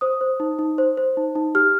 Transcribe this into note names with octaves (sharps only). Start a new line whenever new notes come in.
C5 D#6
C5
D#4
D#4
C5
C5
D#4
D#4
G4 F6